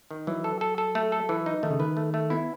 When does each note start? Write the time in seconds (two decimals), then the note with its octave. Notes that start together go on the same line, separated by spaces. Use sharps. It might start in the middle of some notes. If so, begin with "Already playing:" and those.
0.11 D#3
0.27 E3 F#3
0.44 A4
0.61 A4
0.78 A4
0.95 A3
1.12 A4
1.29 E3
1.46 D#4
1.63 D#3 A3
1.70 C#3
1.80 D#3 B4
1.97 A3
2.14 A3
2.30 B3 E4